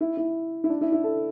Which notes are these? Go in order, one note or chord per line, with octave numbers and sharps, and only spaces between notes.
E4
E4
E4
D4
E4
E4
A4